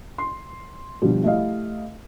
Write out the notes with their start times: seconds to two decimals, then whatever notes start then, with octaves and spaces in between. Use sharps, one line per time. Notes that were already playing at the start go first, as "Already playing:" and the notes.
0.18 C6
1.02 B2 D3 F3 G3
1.24 A3 E4 G4 D#5 F5